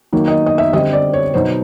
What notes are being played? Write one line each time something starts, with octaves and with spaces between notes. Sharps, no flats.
D#3 F#3 A#3 D#4
D#5
D#5
E5
D3 G3 C4 D#5
D5
C#5
B2 F#3 B3 D#4 C5